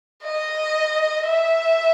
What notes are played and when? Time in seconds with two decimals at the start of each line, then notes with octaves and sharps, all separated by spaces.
0.24 D#5
1.26 E5